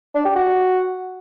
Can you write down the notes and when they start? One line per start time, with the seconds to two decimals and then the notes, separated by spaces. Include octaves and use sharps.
0.15 D4
0.25 G4
0.35 F#4